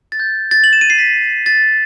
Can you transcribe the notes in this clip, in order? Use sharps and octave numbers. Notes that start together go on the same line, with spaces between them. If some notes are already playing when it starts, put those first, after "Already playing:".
A6
G6
A6
F#7
E7
D#7
C7
B6
A6